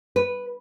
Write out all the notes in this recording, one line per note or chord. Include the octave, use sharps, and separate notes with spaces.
B4